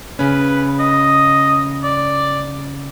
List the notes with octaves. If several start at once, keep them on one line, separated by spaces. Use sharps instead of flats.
C#3 C#4 B4
D#5
D5